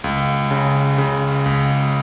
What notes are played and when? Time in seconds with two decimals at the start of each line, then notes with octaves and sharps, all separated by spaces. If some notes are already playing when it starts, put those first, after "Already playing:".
0.04 C#2
0.51 C#3
0.98 C#3
1.46 C#2